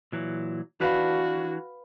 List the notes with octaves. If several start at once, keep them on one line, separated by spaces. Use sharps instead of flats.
A#2 E3 F#3
E3 D4 F#4 B4 F5 B5